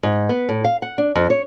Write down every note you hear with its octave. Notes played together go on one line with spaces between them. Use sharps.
G#2
B3
A2
F5
F#5
D4
F2
C#5